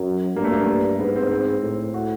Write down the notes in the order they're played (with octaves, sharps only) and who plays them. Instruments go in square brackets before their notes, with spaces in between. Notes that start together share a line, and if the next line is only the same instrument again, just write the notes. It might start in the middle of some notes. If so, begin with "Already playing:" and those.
Already playing: [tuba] F#2 [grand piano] F#3
[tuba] G2 [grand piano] A#3
[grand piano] A3
A#3
[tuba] G#2 [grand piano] B3
[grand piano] C4
C4
[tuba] A2
[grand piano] F#4